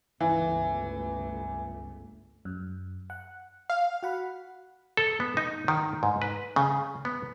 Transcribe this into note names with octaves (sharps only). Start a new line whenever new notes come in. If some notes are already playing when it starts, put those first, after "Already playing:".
G1 C#2 E3 A3
F#2
F#5
F5
F#4 F#5 B5
A4
B3
D#4
D#3
G#2
B4
C#3
B3